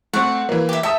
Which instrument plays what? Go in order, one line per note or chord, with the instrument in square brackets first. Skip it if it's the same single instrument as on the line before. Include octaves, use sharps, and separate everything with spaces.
[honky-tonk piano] A3 C4 [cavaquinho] F#5
[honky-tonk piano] E3 A#3
[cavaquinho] G4 E5
[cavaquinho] E5 [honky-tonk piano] G5 A5 D#6